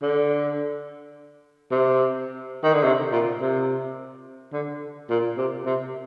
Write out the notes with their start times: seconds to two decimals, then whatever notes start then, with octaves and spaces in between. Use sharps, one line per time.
0.02 D3
1.71 C3
2.63 D#3
2.73 D3
2.84 C3
3.12 A#2
3.41 C3
4.52 D3
5.10 A#2
5.37 C3
5.66 C3